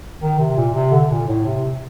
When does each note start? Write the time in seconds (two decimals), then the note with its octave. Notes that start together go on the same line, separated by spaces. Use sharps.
0.21 D#3
0.39 C3
0.57 A#2
0.74 C3
0.91 D3
1.10 A#2
1.28 A2
1.46 C3